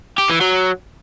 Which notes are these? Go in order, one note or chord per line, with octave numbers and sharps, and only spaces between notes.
G4
E3
F#3